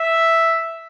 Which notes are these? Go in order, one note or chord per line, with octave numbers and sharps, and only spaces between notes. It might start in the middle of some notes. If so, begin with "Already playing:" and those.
Already playing: E5